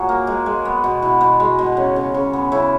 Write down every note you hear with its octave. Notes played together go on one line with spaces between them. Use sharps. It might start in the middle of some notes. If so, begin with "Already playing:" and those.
Already playing: A#2 F#4 G#4 A#4 C#5
A#3
G#3
G#3
B3
B2
B2 E4
B2
G#3
B2
C#3
C#3
C#3
B3
C#3 E4